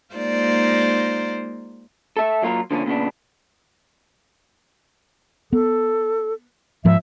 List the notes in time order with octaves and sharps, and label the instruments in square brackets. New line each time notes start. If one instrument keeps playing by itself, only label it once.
[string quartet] G#3 A#3 D#4 F4 C5 D5
[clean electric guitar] A4 E5
F#3 A#3 F4 A#4
D3 F3 A#3 C#4
A#2 C#3 B3 D4
[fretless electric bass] B3 [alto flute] A4
[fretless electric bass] G#2 F3 G#3 [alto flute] E5